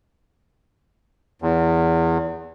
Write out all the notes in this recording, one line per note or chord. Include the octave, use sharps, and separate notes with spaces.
E2